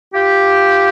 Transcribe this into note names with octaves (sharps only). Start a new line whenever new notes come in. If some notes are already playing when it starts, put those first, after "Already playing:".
F4 G4